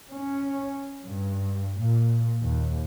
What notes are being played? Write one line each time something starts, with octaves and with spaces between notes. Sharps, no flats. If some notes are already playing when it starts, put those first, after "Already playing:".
C#4
G2
A#2
D#2